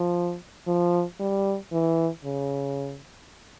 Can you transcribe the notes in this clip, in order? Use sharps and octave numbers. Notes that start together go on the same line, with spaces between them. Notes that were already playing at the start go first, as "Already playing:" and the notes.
Already playing: F3
F3
G3
E3
C#3